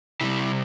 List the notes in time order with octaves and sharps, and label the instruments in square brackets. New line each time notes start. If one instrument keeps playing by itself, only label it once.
[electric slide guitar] C3 G3 E4